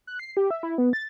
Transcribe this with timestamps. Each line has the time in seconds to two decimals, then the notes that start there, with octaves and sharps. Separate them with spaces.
0.07 F#6
0.19 C7
0.37 G4
0.51 E5
0.63 E4
0.78 B3
0.93 A6